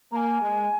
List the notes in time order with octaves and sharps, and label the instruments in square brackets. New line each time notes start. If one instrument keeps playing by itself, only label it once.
[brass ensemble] A#3 [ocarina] G#5 A#5
[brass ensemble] G#3